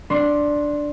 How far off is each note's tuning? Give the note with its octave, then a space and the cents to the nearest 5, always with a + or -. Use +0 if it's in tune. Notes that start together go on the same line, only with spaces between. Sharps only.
D4 +0 C6 +15